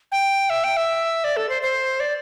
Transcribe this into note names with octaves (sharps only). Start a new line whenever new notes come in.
G5
E5
G5
E5
D5
A4
C5
C5
D5